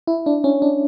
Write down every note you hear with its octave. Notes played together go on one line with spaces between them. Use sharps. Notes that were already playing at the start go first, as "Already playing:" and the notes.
E4
D4
C#4
D4